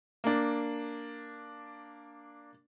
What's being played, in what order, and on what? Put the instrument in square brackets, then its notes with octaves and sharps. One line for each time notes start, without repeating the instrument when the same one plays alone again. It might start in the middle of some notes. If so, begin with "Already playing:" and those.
[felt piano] A#3 D4